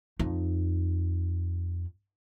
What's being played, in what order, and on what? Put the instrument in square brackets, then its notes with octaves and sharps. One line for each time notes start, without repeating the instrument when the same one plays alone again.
[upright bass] F2 D#4